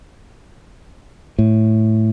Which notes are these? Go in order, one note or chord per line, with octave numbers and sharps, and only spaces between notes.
A2